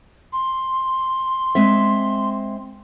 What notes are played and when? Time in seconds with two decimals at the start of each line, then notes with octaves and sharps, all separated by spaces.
0.33 C6
1.55 G#3 C4 E5